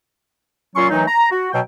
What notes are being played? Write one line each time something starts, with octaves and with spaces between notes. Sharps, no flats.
A#2 F#3 C#4 F4 C6 C#6
D#3 E3 F#3 A3 D#4
A#5
F#4
B2 F#3 G5